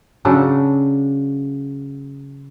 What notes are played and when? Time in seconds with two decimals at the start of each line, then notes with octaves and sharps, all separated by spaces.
0.25 C#3 F#3 D4 A4